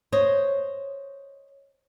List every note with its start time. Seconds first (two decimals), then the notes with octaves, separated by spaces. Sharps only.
0.12 C5 C#5 D#5